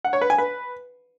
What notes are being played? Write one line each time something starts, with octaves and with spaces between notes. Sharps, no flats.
F#5
C#5
B4
G#5
B4